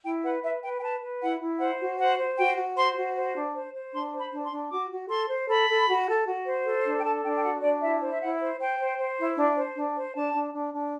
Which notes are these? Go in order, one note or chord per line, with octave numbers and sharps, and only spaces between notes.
E4 G5
B4 F#5
B4 E5
B4 G5
G5
B4 A5
B4
E4 F#5
E4
C5 F#5
F#4
C5 F#5
C5
F#4 G5
F#4
C5 C6
F#4
C5
D4
C5
C5
D4 C6
C5
B5
D4
C6
D4
F#4 D6
F#4
A4 C6
C5
A4 B5
A4
F#4
A4
F#4
C5
A4
D4
G5
A4 A5
D4 G5
G5
F#4 F#5
D4 D5
E4 E5
C5
E5
E4 F#5
C5
C5 G5
C5
C5
E4
D4
C5
D4
C5
D4 A5
D4
D4
D4